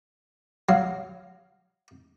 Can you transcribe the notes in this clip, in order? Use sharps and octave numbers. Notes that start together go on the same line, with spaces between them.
F#3 F5